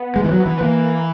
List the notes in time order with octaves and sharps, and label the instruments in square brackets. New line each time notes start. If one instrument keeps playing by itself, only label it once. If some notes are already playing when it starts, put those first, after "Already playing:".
Already playing: [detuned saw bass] B3
[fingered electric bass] G#3
E3
F#3
E3
[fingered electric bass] E3 [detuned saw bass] A#3